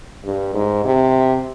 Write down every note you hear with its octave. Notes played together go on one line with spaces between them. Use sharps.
G2
G#2
C3